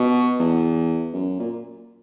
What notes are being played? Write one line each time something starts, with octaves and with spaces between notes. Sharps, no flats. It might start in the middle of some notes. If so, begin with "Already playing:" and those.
Already playing: B2
E2
F#2
A#2